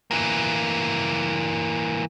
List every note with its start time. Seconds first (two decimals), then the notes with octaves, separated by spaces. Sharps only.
0.11 E3 A#3